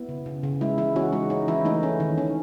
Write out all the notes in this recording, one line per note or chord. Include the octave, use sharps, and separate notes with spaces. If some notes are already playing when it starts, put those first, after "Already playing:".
Already playing: B3 E4
C#3
C#3
C#3
G#3 E4
E3 E4
C#4 F#4
G#3 D#4
C#4 D#4
E3 E4
A3 D#4
C#4
D#3
C#4